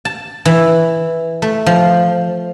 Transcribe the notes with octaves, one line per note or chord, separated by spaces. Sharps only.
A5
E3
A3
F3